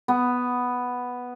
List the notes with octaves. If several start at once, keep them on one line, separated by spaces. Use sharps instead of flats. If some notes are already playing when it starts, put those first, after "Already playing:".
B3